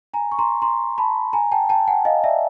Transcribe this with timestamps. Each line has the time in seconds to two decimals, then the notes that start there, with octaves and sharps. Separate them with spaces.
0.14 G#5 A#5
0.32 C#6
0.39 A#5 C6
0.62 A#5 C6
0.98 A5 B5
1.33 G#5 A#5
1.52 G5 A5
1.69 G5 A5
1.88 F#5 G#5
2.05 D#5 F5
2.24 D5 E5